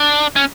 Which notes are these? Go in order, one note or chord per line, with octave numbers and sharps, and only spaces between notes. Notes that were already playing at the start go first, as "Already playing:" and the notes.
Already playing: D4
C#4